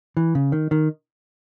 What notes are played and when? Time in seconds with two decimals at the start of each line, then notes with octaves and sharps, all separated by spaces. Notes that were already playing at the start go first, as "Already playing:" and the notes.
0.17 E3
0.35 C#3
0.52 D#3
0.71 D#3